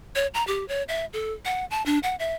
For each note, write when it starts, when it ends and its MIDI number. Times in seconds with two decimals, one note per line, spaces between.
0.15 0.27 73
0.34 0.45 82
0.47 0.66 67
0.68 0.83 73
0.89 1.06 76
1.13 1.33 69
1.45 1.65 78
1.71 1.83 81
1.86 1.99 62
2.03 2.15 78
2.19 2.36 76